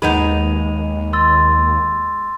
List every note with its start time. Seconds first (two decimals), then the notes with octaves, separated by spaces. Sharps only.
0.02 D#2 G#3 B3 D#4 B5 D#7 F7
1.13 C6 E6 A6